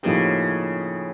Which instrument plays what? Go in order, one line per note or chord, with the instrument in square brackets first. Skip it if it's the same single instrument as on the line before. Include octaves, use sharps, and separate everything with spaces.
[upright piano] A2 F3 A#3 D#4 G4 [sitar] C#3